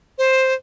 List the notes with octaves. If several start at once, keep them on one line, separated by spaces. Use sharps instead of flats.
C5